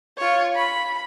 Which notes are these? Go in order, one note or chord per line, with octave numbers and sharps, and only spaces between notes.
F4 C#5
B5